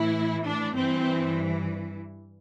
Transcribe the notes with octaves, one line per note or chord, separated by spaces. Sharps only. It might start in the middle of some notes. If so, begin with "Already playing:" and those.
Already playing: A2 E3 E4
D4
G2 E3 C4